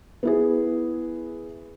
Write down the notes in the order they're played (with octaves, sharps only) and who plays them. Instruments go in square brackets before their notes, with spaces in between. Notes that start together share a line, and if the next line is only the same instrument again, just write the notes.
[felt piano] B3 E4 G#4